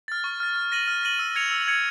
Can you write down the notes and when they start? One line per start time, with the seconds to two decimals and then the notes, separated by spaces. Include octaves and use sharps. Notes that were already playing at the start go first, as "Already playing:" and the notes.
0.08 F6 A6
0.24 C#6
0.40 F6 A6
0.56 F6
0.72 A#6 D#7 F#7
0.88 F6
1.03 A#6 D#7 F#7
1.19 E6
1.36 G#6 C#7 F7
1.51 E6
1.68 G#6 C#7 F7